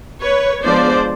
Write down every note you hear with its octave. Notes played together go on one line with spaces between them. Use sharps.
B4 C#5
F3 G#3 B3 D4 C5 D5